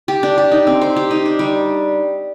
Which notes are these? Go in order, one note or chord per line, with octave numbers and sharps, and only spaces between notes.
G4
D4
G4
D#4
C4
C5
G4
D#4
D4
G3